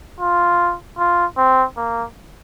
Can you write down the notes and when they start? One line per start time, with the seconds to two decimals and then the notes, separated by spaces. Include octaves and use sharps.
0.20 F4
0.98 F4
1.38 C4
1.77 A#3